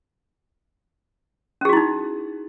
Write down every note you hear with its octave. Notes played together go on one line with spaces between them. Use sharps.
C#4 D#4 E4 F#4 G#4